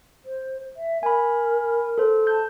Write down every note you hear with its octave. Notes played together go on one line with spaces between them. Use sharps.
C5
E5
A#4 G#5 B5
A4 C5
A5 G6